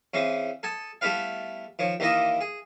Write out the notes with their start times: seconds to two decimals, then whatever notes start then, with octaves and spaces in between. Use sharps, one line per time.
0.14 C#3 E3 C4
0.63 A4 G#5 A5 D#6
1.01 G3 A3 B3 E4 B4 F5
1.79 D#3 F3 C#5
2.00 D#2 D#3 E3 A#3 D#5 E5
2.41 G#4